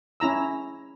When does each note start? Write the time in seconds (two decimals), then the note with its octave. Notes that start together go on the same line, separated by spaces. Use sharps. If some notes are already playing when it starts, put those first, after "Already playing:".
0.20 C#4 E4 A#5 E6